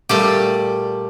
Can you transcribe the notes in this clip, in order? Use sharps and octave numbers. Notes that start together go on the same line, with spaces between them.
A#2 G3 A3 G4